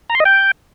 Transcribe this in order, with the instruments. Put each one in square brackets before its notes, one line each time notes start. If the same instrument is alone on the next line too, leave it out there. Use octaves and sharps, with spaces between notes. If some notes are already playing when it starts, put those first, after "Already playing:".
[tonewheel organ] A#5
C6
D#5
G5